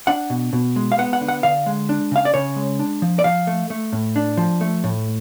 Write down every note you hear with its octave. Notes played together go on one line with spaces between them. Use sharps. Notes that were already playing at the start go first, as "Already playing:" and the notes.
D4 F#5
B2
B2
G#3
F5
B3 F#5
F#5
D3
F#5
D3 F5
G#3
D4
C#3 F5
D5
C#3 C#5
G#3
D4
F3
D5
F3 F5
A3
A3
A2
D4
F3
A3
A2